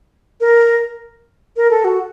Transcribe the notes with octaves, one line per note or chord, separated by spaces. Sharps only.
A#4
A#4
A4
F#4